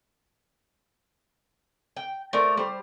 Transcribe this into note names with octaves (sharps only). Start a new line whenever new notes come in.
G5
A3 A#4 C5 D5
G3 C5